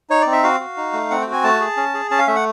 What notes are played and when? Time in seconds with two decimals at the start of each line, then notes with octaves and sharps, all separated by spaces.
0.10 D#4 C#5
0.21 D5
0.27 C4
0.32 E5
0.43 F#4 F5
0.60 F#4
0.77 D#4
0.93 A3
1.10 C4 F#5
1.21 G5
1.27 F#4
1.32 G#5
1.44 A3 A5
1.60 G#4
1.77 C#4
1.94 G#4
2.11 C#4 A5
2.19 F5
2.27 A3 E5
2.36 F#5